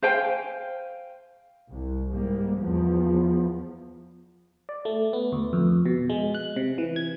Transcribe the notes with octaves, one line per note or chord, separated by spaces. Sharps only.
C5 F5 G5 G#5
C2
G#2 G3 A#3
E2 F3 B3
D5
A3
B3
D2
F2
B2
G#3
F#6
C3
E3
G#6